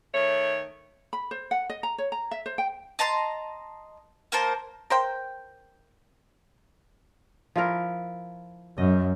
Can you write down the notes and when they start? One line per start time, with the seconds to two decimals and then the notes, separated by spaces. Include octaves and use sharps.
0.15 D#3 A3 C#5
1.13 B5
1.31 C5
1.51 F#5
1.70 D#5
1.83 A#5
1.98 C#5
2.12 A#5
2.31 E5
2.46 C5
2.58 G5
2.99 D#5 A5 A#5 C6
4.32 A#3 A#4 C5 A5
4.90 A#4 C5 G5
7.56 F3 E4 A#4
8.78 F#2 D#5